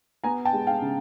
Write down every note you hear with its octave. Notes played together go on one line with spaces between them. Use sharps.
B3 G#5 A#5
G5 A5
G#3
F5 G5
C#3